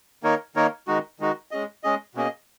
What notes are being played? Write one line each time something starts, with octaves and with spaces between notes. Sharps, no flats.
D#3 A#3 D#4 A#4 C#5
D#3 A#3 D#4 A#4 C#5
D#3 G#3 D#4 F#4
D#3 G#3 D#4 F#4
G#3 C#4 G#4 D#5
G#3 C#4 G#4 D#5
B2 A#3 C#4 G#4 D#5